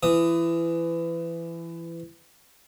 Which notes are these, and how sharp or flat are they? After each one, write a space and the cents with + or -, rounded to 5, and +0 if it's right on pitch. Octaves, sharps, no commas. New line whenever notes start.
E3 +25 D#6 +0